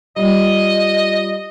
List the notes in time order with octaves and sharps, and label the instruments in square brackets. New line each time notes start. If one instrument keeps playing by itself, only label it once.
[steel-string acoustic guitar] G3 F4 [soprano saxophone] D#5